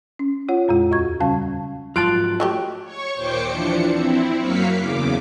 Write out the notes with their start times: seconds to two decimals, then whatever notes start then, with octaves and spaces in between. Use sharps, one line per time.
0.19 C#4
0.49 F4 C#5 F#5
0.68 F2 A#2 G#3 F4
0.91 D#2 F#4 C#6 G#6
1.20 C#3 G3 C#4 F5 A5
1.96 G#2 F3 F#3 F4 A5 F#6 D7
2.40 F#3 A3 G4
2.83 C#5 C#6
3.13 D#2 A#2 C5 G5 D6 C#7
3.48 E3 F3 D4 C#7
3.86 C4 E4
4.38 F#2 F#3 A#3 F5 B6 C#7
4.75 E2 C#3 D6